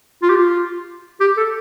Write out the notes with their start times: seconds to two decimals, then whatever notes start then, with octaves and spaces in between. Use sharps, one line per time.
0.22 F4
0.30 G4
0.37 F4
1.21 G4
1.37 A4